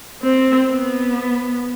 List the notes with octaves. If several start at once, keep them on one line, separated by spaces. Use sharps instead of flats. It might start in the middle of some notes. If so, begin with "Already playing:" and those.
C4
B3